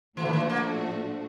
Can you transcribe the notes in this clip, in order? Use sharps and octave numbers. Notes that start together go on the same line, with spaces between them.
A#2 E3 F3 A3 D4 F#4
D#3
E3
A#3